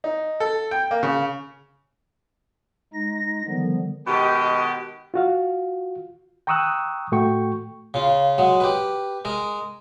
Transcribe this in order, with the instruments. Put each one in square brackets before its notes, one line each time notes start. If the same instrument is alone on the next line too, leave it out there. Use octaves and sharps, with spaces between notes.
[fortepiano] D#4
A4
G5
A#3
C#3
[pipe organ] G#3 D#4 A#6
D3 D#3 F3 G3 B3
[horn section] B2 D#3 G#3 G4
[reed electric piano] F4 F#4 F5
G5 A#5 C#6 D#6 E6 F#6
A2 A3 F#4 G5 C#6
[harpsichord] C#3 F4
F#3 G#3
G4 B4
G#3 A#4